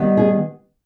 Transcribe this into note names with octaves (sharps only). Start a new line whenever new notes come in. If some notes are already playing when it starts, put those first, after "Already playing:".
Already playing: D#3 G3 B3
G#4